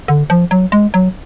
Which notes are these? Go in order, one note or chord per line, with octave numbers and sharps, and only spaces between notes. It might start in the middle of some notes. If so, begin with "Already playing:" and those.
D3
F3
F#3
G#3
F#3